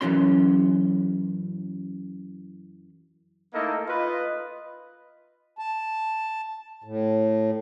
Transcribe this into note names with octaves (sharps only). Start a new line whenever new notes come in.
F#2 A#2 E3 F#3 C#4 C6
A3 A#3 D#4 E4 A4 D#5
F4 B4 D#5
A5
A2